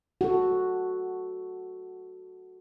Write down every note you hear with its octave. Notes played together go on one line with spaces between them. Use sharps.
F#4 A4